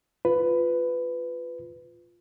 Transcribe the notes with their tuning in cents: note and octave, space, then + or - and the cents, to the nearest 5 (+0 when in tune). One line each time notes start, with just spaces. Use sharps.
F4 +0 B4 +15